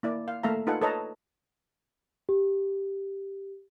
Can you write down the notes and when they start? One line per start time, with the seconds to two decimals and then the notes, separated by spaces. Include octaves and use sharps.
0.03 A#3 E4 D5
0.28 F5
0.43 A3 A#3 A4 E5 F5 A#5
0.67 D#4 F4 A4 B4 F#5 G#5
0.82 A4 B4 C#5 D#5 A5 A#5
2.29 G4